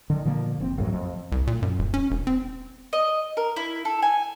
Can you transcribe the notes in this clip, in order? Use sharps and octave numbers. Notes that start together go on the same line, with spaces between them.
D3 D#3
A#2 D3 F3 A#3
F#1 C#3 C4
A1 F#2 A2 F#3
F2
C2
A#2
F#2
D#1
C#4
E1
C4
D#5
A#4
E4
A4
G#5